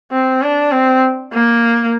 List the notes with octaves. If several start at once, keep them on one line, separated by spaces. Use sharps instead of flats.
C4
D4
C4
A#3